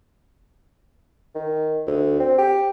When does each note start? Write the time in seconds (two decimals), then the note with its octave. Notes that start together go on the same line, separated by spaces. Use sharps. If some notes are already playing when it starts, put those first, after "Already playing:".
1.35 D#3
1.87 D2
2.20 C4
2.38 G4